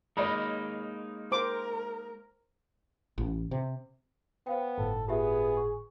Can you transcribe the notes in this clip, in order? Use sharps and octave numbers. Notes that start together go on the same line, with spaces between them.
G#3 A#3 D#4 C#5 D#5 B5
A#4 C5 D6
A1
C3
B3 C5 F5 G5
G1 A2 A4
B3 F4 G4 G#4 E5
C#6